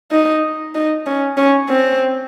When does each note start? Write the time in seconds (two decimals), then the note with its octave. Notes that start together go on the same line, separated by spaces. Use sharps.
0.11 D#4
0.75 D#4
1.06 C#4
1.37 C#4
1.69 C4